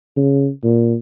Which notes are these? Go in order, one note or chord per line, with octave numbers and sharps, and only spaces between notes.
C#3
A#2